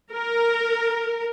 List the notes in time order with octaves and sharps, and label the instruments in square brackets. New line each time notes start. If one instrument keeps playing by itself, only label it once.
[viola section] A#4